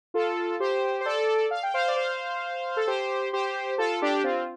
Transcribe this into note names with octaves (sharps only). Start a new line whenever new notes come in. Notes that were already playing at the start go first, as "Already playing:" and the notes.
F4 A4
G4 C5
C5
A4 D5
F5
G5
C5 F5
D5
C5 F5
A4
G4 C5
G4 C5
F4 A4
D4 G4
C4 F4